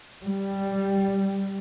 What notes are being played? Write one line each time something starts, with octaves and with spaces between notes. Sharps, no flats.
G3